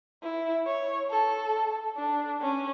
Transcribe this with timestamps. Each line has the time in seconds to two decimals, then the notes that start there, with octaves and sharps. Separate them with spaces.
0.23 E4
0.67 C#5
1.10 A4
1.97 D4
2.41 C#4